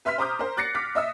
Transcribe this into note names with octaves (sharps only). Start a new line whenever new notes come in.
B4 E5 C6 F6 B6
C5 A#5 D6 D#6 F6 G6
A#4 C5
D6 F#6 A6 A#6 C7 C#7
D6 F6 B6
D#5 E5 D#6 E6